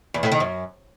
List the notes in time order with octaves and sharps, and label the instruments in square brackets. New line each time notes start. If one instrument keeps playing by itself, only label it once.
[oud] E2
A2
D#3
F#2